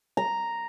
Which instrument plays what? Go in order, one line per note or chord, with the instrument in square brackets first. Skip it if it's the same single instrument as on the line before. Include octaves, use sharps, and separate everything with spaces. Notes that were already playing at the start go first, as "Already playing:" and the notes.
[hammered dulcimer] A#5